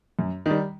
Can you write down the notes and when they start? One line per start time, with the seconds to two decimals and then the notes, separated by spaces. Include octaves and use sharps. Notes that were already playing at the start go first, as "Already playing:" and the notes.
0.19 F#2
0.46 D#3 G3